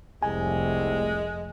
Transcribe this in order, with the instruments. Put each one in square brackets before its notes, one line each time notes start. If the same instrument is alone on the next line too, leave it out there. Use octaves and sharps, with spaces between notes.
[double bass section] F1 A3 [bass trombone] C2 [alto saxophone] G#3 [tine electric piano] G#5